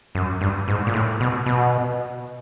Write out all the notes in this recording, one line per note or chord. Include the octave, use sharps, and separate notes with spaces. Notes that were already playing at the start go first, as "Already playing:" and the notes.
F#2
G2
G#2
A#2
A2
B2
B2